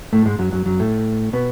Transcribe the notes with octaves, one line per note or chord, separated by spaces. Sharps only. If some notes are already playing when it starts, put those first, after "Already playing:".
A2 A3
G#2 G#3
F#2 F#3
F#2 F#3
F#2 F#3
A2 A3
B2 B3